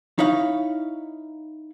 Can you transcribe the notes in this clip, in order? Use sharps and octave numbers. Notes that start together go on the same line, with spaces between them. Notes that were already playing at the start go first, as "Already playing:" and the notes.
D#4 E4 C#5 F5